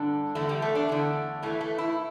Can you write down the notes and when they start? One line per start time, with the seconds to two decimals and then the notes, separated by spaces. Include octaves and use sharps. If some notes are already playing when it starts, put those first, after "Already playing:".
Already playing: G2 D3 D4
0.35 E2 D3 A3
0.49 G3
0.62 A3
0.75 D4
0.89 E2 D3 A3
1.43 A2 E3 A3
1.61 A3
1.78 E4